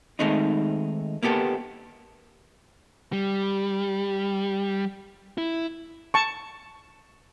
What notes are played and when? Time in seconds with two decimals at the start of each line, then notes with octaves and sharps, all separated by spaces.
0.19 D#3 G#3 A3 C4 D#4
1.23 A#3 B3 G4 A4
3.13 G3
5.38 E4
6.14 A5 C#6